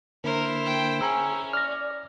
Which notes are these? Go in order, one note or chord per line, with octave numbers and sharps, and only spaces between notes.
D3 A#3 E4 A#4 C5
G5
C#4 G#4 G#5 A#5 E6
D5 F6 A#6